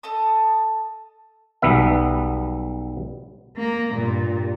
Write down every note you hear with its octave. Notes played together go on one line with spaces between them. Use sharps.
A4 D#5 A5 D#6
B1 G3 B3 E5
A#3
G2 A#2